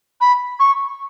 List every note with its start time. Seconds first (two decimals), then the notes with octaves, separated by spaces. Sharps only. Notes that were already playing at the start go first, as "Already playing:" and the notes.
0.21 B5
0.59 C#6